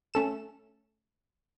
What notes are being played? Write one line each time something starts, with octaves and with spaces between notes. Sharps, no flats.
A3 C#4 A4 E7